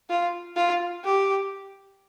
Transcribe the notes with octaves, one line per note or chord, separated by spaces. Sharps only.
F4
F4
G4